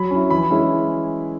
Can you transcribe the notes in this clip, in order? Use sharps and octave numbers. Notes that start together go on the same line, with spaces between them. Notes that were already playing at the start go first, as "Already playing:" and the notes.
Already playing: F#3 B5
C#4 E4
E3 B5
G#3 C#4 E4